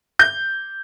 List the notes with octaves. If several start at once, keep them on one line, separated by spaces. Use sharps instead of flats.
G6